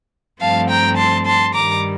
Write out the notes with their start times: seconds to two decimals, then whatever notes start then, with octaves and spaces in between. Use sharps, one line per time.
0.41 G2 F3 A3 C4 F5 A5
0.69 G5 A#5
0.97 A5 C6
1.26 A5 C6
1.54 G2 D#3 G3 A#5 D6